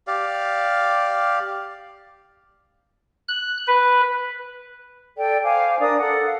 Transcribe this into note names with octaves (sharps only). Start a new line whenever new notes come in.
G4 D5 F5
F#6
B4
A4 D5 G5
C5 F5 G#5 D6
D4 A#4 D5 D#6
A4 F#5
F5